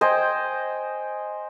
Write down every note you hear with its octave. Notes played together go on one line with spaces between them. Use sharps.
C5 D#5 G5 G#5